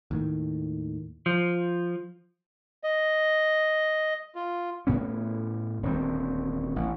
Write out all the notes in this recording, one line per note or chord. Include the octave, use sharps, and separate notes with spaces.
D#2 A2 D#3
F3
D#5
F4
A2 B3 C#4
D#1 D2 A#3 C4
A1